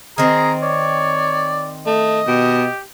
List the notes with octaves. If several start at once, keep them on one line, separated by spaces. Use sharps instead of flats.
D#3 C4 G#4 A#5
C#5 D5
A3 D#5
B2 G4